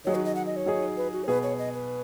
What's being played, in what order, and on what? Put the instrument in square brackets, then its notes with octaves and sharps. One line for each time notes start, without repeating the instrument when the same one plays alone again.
[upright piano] D#3 F#3 D#4 G#4 [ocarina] C#5
[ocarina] F#4
D#5
F#5
D#5
C#5
[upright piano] F#3 D#4 G#4
[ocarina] B4
F#4
C#5
[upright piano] B2 B3 G#4 [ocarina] B4
[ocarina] C#5
D#5
B4